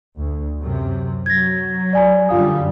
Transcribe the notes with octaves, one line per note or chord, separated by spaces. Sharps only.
D2
F#2 C3
F#3 G#6 A#6
D5 G#5 A#5
F#2 D3 G3 F4 F5 D#6